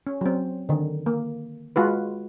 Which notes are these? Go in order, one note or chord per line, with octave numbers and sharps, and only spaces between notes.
C#4
F#3 C4
D3 D#3
A#3
G#3 F4 F#4 B4